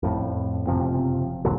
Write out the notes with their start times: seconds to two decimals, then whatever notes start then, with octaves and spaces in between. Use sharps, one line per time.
0.03 F2 A2
0.67 F#1 C3 F3 C4
1.45 D#2 A#2 D3 F#3